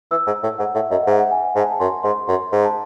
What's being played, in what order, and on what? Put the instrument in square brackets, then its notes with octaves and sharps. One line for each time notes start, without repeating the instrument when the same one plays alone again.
[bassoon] E3 [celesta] E6
[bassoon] G#2
A2
[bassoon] G#2 [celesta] F#5
[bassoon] A2 [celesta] E5
[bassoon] F#2 [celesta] D#5
[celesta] F#5
[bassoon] G#2 [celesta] E5
[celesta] F#5
G#5
G#5
[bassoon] G#2 [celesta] A5
[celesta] G#5
A5
[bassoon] F#2 [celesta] C6
[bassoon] G#2 [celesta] C6
[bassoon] F#2 [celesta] C6
[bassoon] G#2
[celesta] A5